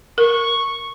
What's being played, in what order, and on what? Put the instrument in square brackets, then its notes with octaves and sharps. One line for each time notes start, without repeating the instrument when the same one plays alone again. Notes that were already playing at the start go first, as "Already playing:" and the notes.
[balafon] A#4 [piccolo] C#6